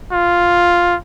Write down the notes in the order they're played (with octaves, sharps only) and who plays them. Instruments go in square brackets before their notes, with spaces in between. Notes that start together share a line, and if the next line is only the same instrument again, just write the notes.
[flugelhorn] F4